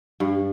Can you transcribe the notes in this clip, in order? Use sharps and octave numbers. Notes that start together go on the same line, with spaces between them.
G2